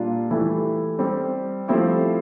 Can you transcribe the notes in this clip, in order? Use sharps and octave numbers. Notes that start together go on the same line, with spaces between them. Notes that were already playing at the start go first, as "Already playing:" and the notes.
Already playing: A#2 G3 D4 F4
E3 A3 E4 G4
G3 C4 G4
F3 A3 C4 E4 G4